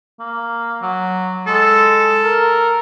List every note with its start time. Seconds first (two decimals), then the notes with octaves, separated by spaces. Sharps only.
0.20 A#3
0.82 F#3
1.48 G#3 A4
2.24 A#4